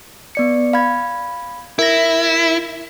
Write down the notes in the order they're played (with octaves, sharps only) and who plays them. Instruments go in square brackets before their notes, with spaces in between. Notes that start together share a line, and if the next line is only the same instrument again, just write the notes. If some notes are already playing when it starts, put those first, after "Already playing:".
[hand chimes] B3 D5 C#7
F5 B5 G#6
[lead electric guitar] E4 [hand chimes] A#4 A#6